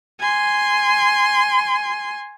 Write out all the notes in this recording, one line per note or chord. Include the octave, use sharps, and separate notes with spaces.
G#5 C6